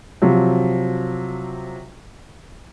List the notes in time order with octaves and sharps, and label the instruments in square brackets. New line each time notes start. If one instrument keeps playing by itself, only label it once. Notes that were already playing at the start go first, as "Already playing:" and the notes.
[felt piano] C3 F3 F#3